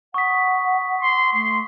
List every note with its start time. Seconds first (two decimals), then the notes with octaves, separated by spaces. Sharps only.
0.14 F#5 C#6 D#6 B6
1.03 C6
1.33 A3 C6